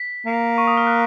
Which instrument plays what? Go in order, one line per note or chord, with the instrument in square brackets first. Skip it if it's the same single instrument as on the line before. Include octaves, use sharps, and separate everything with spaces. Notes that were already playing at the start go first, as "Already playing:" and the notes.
Already playing: [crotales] B6
[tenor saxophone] A#3
[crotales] C#6
D#6
F6
F#6